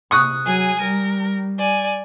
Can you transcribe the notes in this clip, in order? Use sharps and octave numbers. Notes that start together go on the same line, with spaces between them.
C3 C#6 D#6 F#6
F#3 G#4 G#5
G3 A#4
D5 G#5